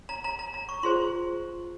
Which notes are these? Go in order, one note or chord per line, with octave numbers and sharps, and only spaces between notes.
A#5
A#5
A#5
A#5
C#6
F4 G#4 C5 C6